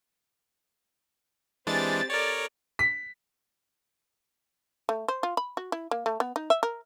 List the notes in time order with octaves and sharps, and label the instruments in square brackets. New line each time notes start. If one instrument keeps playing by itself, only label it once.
[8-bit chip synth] E3 G#3 D4 [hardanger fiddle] C4 G4 [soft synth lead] A6
[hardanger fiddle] A4 D5 [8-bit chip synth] A#4 C#5
[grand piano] B6
[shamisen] A3
C5
F4
B5
F#4
E4
A#3
A3
B3
D#4
E5
A#4